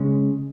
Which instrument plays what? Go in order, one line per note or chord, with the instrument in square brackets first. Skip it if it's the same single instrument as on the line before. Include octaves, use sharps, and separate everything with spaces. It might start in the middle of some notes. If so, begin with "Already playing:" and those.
Already playing: [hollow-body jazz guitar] C#3 G#3 C#4